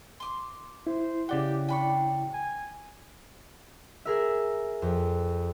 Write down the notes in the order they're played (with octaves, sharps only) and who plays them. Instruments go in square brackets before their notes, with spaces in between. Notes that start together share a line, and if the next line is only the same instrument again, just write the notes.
[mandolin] C6 D6
[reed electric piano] E4 [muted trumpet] C5
[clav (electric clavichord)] C#3 D5 F#5 [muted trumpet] G4 [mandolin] G5
[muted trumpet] D4 [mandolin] G5 B5 C#6
[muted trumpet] G#5
[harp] G#4 A#4 E5
F2